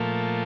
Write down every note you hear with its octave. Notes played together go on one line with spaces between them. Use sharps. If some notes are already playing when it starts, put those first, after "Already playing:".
Already playing: A#2 F3 A3